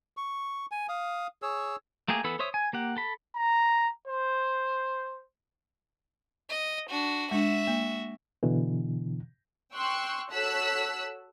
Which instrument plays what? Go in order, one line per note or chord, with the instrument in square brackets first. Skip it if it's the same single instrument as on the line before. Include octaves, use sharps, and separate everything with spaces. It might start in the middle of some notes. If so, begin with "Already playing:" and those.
[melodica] C#6
G#5
F5 D#6
G#4 C#5 E6
[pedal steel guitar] A3 A#3 G4 G#4
E3 B3 A4 B5 E6
C5 C#5 E5 D#6
G#5
A#3 G4 F#5
A4 B5
[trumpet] A#5
C5
[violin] D#5
D4 F#4
[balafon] G#3 D4 [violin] F#4 E5
[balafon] A#3
[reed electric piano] B2 D3 E3
[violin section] G5 C6 C#6 E6 F#6
F#4 A4 C#5 E6 F#6 B6